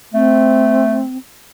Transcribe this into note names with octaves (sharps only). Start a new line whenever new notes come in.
A3 C4